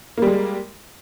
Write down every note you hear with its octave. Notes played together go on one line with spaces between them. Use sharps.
G3 G#3 A#3